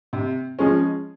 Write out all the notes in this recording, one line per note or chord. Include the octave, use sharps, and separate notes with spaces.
C3
F3 G#3 C#4